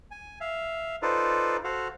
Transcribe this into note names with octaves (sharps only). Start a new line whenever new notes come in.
G#5
E5 F5
D#4 F4 A4 B4 C5 D5
F#4 A4 C5 F5 F#5